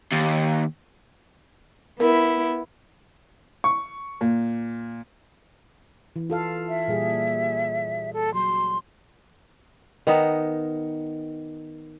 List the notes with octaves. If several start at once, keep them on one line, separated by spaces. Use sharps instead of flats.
D#2
B3 E4 A#4
C#6
A#2
E3
F4 A4 F5
E5
A#2 G3 G#4
A4
F#3 C6
D#3 B3 D#4